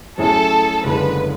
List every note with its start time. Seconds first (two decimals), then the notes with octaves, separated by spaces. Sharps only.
0.18 A2 F#3 C#4 E4 G#4 A4
0.83 F#1 F#2 D3 G#3 B4